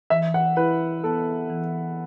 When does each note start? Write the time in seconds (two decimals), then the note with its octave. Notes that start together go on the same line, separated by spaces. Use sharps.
0.10 E3 E5
0.34 F#5
0.56 E4 B4
1.04 B3 A4
1.50 E3